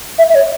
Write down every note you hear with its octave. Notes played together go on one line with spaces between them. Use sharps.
E5
E5
C#5